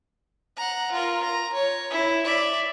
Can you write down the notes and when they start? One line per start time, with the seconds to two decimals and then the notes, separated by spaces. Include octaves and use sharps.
0.57 F#5 A#5
0.92 F4 A#4
1.25 A#5
1.54 C#5
1.91 E4
2.25 D5 E5